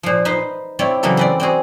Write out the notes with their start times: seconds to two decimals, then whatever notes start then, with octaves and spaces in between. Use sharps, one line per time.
0.03 A#2 F3
0.25 D#4 B4 C5
0.79 C4 E4 C#5 D5
1.03 C#3 E3 F#3 A#3 B3 A4
1.17 C4 B4 D5
1.40 C4 F#4 G#4